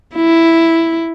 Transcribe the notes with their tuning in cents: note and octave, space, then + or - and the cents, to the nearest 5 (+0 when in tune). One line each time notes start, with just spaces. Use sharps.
E4 +0